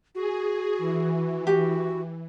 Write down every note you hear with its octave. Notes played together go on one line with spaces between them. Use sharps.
F#4 G#4
E3
F#4 G4